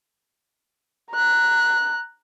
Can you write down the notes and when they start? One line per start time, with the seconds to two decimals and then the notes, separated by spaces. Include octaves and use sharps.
1.11 A#5 F#6